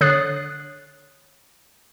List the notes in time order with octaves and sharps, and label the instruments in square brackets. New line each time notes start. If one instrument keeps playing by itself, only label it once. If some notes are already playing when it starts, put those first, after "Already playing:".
[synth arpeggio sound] D3 C#5 D#6 F#6 A6 C7